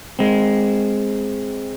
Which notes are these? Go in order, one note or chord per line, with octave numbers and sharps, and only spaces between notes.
G#3 C4